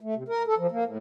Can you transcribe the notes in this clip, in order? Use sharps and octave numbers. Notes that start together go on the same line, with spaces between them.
A3
C3
A#4
A4
F3
A#3
A2